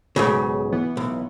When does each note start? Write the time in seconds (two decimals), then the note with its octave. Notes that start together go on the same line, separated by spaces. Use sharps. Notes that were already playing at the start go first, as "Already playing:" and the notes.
0.16 B1 G#2 C#3
0.72 E3 B3
0.97 B1